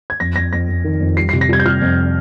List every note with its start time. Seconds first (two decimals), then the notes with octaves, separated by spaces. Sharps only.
0.10 G#6
0.20 F2 A#6
0.36 F2 A#6
0.53 F2 A#6
0.69 F2
0.84 D#3
1.01 F2
1.17 G3 C7
1.29 C3 C7
1.41 A#6
1.49 G3 G#6
1.60 G6
1.66 G3 F6
1.82 F2